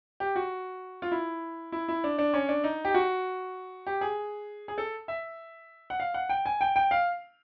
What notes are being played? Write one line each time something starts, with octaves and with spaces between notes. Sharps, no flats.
G4
F#4
F4
E4
E4
E4
D4
D4
C#4
D4
D#4
G4
F#4
G4
G#4
G#4
A4
E5
F#5
F5
F#5
G5
G#5
G5
G5
F5